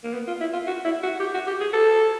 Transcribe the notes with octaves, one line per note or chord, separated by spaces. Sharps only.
A#3
B3
F4
E4
F4
F#4
E4
F#4
G4
F#4
G4
G#4
A4